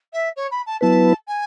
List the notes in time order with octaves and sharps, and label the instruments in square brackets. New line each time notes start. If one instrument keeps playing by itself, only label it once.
[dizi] E5
C#5
B5
A5
[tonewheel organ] F#3 B3 E4 B4 [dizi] A5
[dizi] G#5